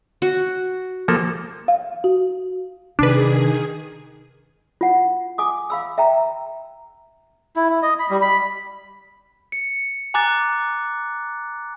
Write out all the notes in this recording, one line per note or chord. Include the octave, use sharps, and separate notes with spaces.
F#4
F3 A#3 A4
F5
F#4
C3 D#3 D4 G#4 B4
F4 F#5
G#5 D6 D#6
F5 B5 E6
E5 G5 A#5
E4
E4
D#5
B5
G3
B5
C#7
G#5 A#5 D6 F#6 A6